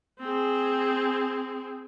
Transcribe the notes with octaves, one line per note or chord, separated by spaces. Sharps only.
C4 G#4